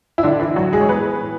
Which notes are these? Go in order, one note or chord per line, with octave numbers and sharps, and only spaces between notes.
E4
A2 D3 D4
E3 E4
A2 F#3 F#4
G#3 G#4
C#5
E3 B3 B4
A2